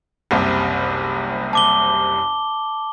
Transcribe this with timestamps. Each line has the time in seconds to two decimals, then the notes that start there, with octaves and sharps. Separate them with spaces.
0.31 F#1 C2 C3
1.53 A5 D6 G7